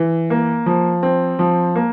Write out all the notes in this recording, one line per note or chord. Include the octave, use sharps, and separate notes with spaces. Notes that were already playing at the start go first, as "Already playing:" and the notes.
Already playing: E3
A#3
F3
C4
F3
A#3